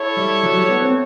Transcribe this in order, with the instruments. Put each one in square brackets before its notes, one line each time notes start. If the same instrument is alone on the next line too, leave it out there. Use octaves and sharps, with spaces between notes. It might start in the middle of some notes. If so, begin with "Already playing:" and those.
Already playing: [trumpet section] E4 A4 C#5
[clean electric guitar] G3
F#3
G3
B3
C4